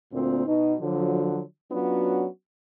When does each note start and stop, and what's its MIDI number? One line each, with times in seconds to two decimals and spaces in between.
0.12 0.44 38
0.12 0.44 46
0.12 0.44 60
0.46 0.75 47
0.46 0.75 63
0.81 1.40 50
0.81 1.40 53
0.81 1.40 54
1.71 2.26 54
1.71 2.26 59
1.71 2.26 61
1.71 2.26 62
1.71 2.26 65
1.71 2.26 66